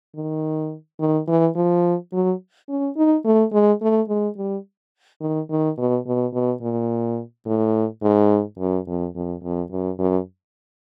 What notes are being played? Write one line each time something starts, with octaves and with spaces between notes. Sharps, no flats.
D#3
D#3
E3
F3
F#3
C#4
D#4
A3
G#3
A3
G#3
G3
D#3
D#3
B2
B2
B2
A#2
A2
G#2
F#2
F2
F2
F2
F#2
F#2